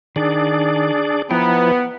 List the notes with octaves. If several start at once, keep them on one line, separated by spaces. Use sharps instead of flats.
D#3 D4 G#4 D5
F3 B3 E4 G5 A#5